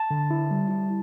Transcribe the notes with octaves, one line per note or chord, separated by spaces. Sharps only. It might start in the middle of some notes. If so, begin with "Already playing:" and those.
Already playing: A5
D3
E4
G3
E4